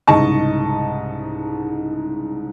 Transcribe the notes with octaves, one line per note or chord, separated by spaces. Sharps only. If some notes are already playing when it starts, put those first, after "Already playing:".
C2 G#2 C#3 D#5 A5 C#6